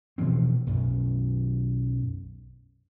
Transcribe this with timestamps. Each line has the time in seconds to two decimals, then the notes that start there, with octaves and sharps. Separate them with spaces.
0.18 B2 E3 F3 C4
0.67 B1 F#2